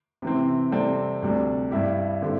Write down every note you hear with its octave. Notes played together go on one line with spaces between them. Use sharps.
C3 E3 C4
C3 G3 C4 A4
D2 C3 G3 D4
G2 G3 E4 G4
D3 C4 E4 G4